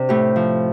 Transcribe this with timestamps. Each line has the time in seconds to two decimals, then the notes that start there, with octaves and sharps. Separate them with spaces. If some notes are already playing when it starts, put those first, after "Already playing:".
Already playing: C3 D4
0.09 A2 G4
0.36 F3